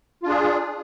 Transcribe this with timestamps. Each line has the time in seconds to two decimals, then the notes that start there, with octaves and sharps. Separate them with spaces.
0.23 F4
0.26 D4
0.29 G#4